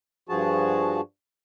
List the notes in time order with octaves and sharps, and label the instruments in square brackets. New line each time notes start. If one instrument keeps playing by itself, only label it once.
[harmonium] G2 F3 F#4 G#4 A5